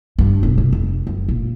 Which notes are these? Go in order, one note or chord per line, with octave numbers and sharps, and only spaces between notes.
G2
E1
C3
F1
F#2
A#2